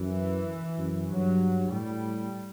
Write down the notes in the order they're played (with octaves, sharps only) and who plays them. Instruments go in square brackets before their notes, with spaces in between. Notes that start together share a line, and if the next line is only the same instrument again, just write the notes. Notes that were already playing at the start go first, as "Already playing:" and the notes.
Already playing: [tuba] F#2 [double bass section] E3
[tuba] F#2
[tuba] G2 [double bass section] F#3
[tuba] A2 [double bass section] G3